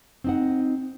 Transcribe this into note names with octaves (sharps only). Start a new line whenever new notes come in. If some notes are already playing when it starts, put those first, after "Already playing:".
C4 D#4 F#5